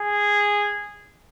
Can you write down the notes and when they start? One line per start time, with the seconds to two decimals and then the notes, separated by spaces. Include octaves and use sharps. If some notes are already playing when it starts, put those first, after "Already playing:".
Already playing: G#4